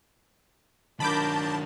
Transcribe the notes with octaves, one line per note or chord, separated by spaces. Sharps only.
D#3 F#3 D4 A#4 A5 B5 D6 G6